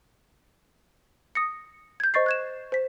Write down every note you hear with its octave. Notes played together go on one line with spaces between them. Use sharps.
D#6 A#6 C#7
G6 G#6
C5 D#5 C#6 A6 C7
F#6 G#6 E7
C5 B6